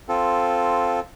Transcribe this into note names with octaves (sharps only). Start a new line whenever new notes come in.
C4 F4 A4